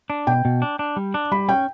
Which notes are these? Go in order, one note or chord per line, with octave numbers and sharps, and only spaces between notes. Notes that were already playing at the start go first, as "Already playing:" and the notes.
D4
B2 G5
B2
D4
D4
G3
D4
G3 B5
C#4 G5